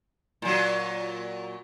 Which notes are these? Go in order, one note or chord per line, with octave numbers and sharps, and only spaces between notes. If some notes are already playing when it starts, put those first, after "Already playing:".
A#2 F#3